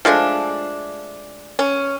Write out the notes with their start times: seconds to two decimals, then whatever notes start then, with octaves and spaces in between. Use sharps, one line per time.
0.05 F3 G#3 A3 D4
1.59 C#4